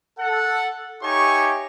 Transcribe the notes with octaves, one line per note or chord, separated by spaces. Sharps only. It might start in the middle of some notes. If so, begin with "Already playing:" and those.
A4 F#5
D#4 G4 C#5 E5 G#5 C#6